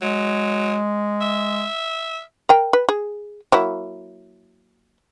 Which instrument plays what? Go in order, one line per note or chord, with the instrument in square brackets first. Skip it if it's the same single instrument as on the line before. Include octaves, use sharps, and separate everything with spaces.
[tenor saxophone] F#3 [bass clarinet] G#3
[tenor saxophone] E5
[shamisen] A#4 G5
B4
G#4
F#3 A#3 E4